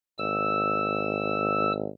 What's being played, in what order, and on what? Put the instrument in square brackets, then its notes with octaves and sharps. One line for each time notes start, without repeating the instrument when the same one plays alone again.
[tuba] G#1 [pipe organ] E6